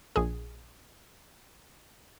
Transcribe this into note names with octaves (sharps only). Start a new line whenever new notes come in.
A#1 G#4